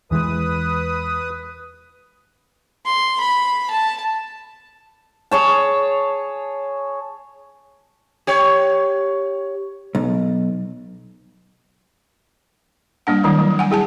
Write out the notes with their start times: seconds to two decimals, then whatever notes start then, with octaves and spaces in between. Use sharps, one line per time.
0.11 E2 E3 G#3 B4 D#6
2.86 C6
3.20 B5
3.70 A5
5.31 G#4 C#5 A5
8.27 G4 C#5
9.95 B1
13.07 G3 A#3 D4 F#5
13.24 D#3 F#3 G3 E4
13.39 G3
13.59 F#5 G#5
13.71 E4 G#4 G#5 A5